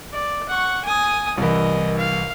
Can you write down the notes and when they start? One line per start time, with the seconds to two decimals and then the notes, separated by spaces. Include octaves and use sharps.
0.13 D5
0.49 F#5 C#6
0.84 G#5 D#6
1.37 C2 E3 A#4 D#5
1.97 F5